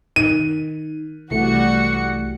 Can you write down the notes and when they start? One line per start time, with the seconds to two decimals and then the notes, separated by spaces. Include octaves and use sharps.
0.16 D#3 D#7
1.31 C2 E3 G3 A3 F#4 C#7